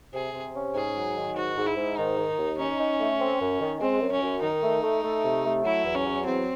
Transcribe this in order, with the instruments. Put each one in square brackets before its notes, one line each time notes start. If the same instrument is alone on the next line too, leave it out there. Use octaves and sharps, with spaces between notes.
[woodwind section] C3 [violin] G#4
[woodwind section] C3
C#4
[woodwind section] G#2 [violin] G#4
[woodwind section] F#3
D#3
[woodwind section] G#2 [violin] F#4
[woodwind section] G#2
[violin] E4
[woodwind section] G#2
[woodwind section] D#3 [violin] D#4
[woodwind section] D#3
D#2
[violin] C#4 [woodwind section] D#4
[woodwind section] D#4
A3
C4
F#2
D#3
[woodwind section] G#3 [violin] C4
[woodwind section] F#2
[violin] C#4
[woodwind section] F#2
[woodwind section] D#3 [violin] D#4
[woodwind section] A3
A3
A3
C3
A3
[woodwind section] F#3 [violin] E4
[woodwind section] E2
[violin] C#4
[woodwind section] F#3
[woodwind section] E2 [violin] C4